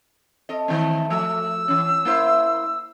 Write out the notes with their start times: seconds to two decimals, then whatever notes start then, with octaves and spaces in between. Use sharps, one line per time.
0.49 C4 A4 D#5
0.68 D#3 A3 C4
1.10 F3 A3 E6
1.68 E3 C#4
2.05 A#3 E4 C5